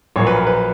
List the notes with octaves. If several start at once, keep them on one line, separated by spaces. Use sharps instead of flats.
A#1 A#2 F#3 C#5
B4
A#4
B4